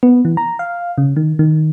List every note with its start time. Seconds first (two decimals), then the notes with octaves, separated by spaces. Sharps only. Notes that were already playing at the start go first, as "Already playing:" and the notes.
0.03 B3
0.25 E3
0.37 A#5
0.59 F5
0.98 C#3
1.16 D#3
1.39 D#3